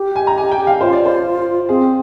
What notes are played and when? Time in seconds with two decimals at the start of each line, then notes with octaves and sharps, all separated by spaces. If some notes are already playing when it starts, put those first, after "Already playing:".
Already playing: G4
0.16 G#5
0.27 A#5
0.38 G#5
0.52 G5
0.67 F5
0.81 F4 C5
0.93 D5
1.06 C5
1.69 C4 G#4